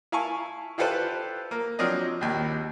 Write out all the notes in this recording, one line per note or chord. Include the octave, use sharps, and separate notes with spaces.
E4 F5 G#5 A5 C#6
E4 F4 G4 A4 B4 C5
A#3
F3 F#3 C4 D4 D#5
A#1 D#2